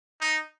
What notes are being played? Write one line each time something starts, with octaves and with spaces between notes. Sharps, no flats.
D#4